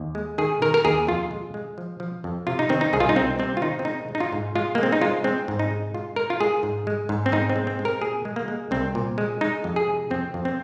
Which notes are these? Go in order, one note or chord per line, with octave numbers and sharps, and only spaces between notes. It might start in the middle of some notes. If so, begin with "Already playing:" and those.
Already playing: D#2
G#3
D#3 G#4
D#3 A#4
A#4
D#2 G#4
F2 F4
G#3
G#3
F3
F3
F2
C3 F4
D#4
D#3 C4
D#4
C2 G#4
F4
D#4
C2 C4
C3 C4
F4
D#3 D#4
C4
G#3 D#4
G#3
D#4
F4
G#2
G#3 F4
G#3 A#3
C4
D#4
G#3 F4
G#3 C4
G#2
D#4
G#3
G#3 F4
G#3 A#4
F4
G#3 G#4
G#2
G#3
G#2
C4
G#2 D#4
C4
G#3
C4
G#3
A#4
A#2 G#4
G#3
A#3
G#3
C2 C4
A#2
G#3
G#3 D#4
F2
G#4
C3
F2 C4
F2
C4